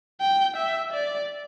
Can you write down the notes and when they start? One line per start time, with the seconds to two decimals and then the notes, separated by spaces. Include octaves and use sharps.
0.21 G5
0.57 E5
0.93 D5